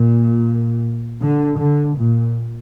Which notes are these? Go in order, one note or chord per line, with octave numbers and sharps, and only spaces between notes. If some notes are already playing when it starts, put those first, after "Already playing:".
Already playing: A#2
D3
D3
A#2